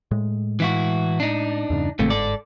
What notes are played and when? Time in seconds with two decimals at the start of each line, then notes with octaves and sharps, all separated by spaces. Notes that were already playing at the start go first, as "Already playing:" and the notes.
0.11 A2 G#3
0.60 E3 E4 F#4
1.20 D4 D#4
1.70 E2 G2 C#3
1.99 G1 D#2 G#2 C3 A3
2.10 A4 D5